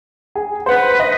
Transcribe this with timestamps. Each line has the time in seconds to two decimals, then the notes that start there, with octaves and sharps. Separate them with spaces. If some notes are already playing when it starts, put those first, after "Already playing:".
0.35 G#4
0.66 B4 C5 F#5
1.00 D#5